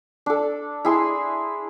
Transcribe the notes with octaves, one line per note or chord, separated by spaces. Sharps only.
D4 A4
E4 G#4 C6